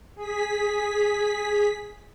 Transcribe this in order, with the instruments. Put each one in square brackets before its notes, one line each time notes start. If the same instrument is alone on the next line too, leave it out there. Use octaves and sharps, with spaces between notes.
[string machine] G#4 B6